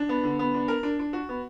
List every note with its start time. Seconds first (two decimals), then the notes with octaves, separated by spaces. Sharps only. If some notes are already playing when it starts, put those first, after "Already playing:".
Already playing: D4
0.09 B3
0.23 D3
0.39 B3
0.54 D4
0.68 A#4
0.83 D4
0.99 D4
1.13 F#4
1.29 B3